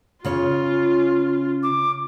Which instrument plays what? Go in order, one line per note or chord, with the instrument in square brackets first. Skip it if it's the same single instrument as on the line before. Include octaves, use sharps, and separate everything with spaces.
[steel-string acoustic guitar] C#3 C#4 C#5 [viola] F4
[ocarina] D6